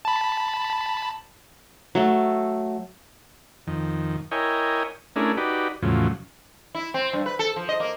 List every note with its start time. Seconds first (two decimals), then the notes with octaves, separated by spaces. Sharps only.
0.05 A5 B5
1.95 F#3 A3 A4
3.67 F2 D#3
4.31 E4 A#4 C#5 D#5 G5 G#5
5.16 A3 C#4 D4 E4 G#4 A#4
5.37 D#4 F#4 G4 B4 D5
5.82 E2 A2 C#3 F3 F#3
6.75 E4
6.94 C4
7.13 G2
7.26 B4
7.39 A4
7.56 F3
7.69 D#5
7.80 A#3